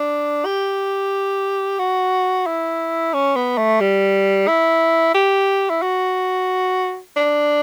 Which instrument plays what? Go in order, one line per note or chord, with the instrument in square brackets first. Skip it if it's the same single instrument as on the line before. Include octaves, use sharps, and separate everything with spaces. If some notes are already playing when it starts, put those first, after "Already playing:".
Already playing: [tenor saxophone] D4
G4
F#4
E4
C#4
B3
A3
G3
E4
G4
E4
F#4
D4